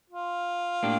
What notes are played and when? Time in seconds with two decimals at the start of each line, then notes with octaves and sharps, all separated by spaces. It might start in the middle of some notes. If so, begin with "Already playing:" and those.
0.10 F4
0.83 A2 A#3 D4 G4